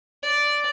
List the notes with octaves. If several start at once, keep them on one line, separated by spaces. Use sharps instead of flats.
D5